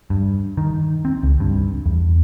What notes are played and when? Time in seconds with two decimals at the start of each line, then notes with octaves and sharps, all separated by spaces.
0.10 G2
0.57 D#3
1.05 C4
1.23 C#2
1.40 G2
1.86 E2